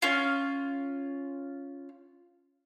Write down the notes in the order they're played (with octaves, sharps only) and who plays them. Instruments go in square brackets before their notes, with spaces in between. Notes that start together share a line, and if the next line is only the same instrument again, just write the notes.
[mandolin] C#4 F4